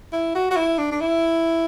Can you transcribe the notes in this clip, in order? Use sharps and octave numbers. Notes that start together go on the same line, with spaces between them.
E4
F#4
F#4
E4
D4
D4
E4